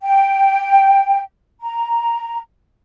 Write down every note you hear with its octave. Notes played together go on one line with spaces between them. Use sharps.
G5
A#5